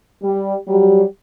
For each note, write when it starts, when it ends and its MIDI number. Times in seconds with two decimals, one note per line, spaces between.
0.23 0.54 55
0.69 1.02 54
0.69 1.02 55